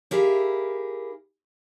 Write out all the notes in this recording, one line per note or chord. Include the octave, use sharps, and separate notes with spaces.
E4 G4 G#4 A#4 F5